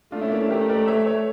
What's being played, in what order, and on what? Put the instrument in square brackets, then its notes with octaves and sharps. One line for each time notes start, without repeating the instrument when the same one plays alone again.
[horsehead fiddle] A3 [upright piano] D4 F4
[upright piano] C#4 E4
A#3 D4
C#4 E4
[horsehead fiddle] A3 [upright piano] G4 A#4
[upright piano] A#4 D5
C#5 E5
C#5 E5